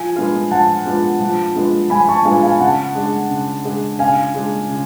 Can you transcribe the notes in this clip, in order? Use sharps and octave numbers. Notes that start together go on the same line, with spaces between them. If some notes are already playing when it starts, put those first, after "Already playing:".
Already playing: F3 G#5
G#3 B3 D4 F4
F3 F#5 A5
G#3 B3 D4 F4
F3
G#3 B3 D4 F4
F3 G#5 B5
A5 C#6
G#3 B3 D4 F4 F5 G#5
F5 G#5
C#3 F#5 A5
G#3 D4 G#4
C#3
G#3 D4 G#4
C#3 F5 G#5
G#3 D4 G#4
C#3